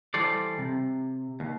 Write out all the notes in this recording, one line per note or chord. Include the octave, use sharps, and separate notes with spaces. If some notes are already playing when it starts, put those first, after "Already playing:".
E3 G3 A4 C5 D5
C3
D#2